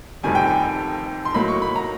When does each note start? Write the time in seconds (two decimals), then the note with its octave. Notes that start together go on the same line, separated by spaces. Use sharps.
0.23 F1 F2 C3 D#3 G3 G#5
0.35 G5
0.47 G#5
1.25 C6
1.34 A2 F#3 A#3 D#4 B5
1.48 C#6
1.62 B5
1.76 A#5